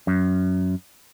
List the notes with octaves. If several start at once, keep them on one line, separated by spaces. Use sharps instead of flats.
F#2